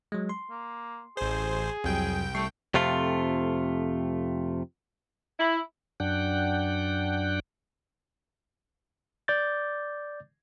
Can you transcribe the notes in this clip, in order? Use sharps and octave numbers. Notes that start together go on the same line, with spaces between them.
F#3 G#3
C6
A#3
A1 G#4 C5
C2 F2 F#3 G5
G3 A3 C#6 C7
F2 C3 A3 F4
E4
F#2 D4 F#5 G5
D5 D6 G6 A6